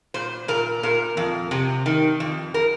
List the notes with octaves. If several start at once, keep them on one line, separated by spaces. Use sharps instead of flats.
A#2 C5
A#2 A#4
A#2 A#4
F2
C3
D#3
F2
A#4